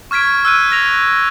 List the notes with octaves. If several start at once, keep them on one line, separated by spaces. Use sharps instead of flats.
C#6 F6 G#6 B6 D7
E6 F#6 D#7
G#6 A#6 F7